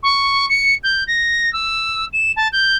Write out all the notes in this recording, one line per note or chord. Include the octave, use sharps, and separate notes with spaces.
C#6
C#7
G6
A#6
E6
E7
A5
G6